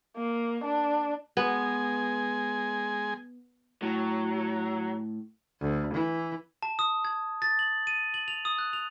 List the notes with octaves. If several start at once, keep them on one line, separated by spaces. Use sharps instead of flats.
A#3
D4
G#3 B3 G#5
A2 F#3
D2
E3
A5
D#6
G#6
A6
F#7
D#7
F#7
F7
D#6
F#6
F7